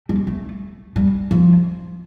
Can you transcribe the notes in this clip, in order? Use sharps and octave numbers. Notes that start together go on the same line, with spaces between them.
G3
A3
G3
F3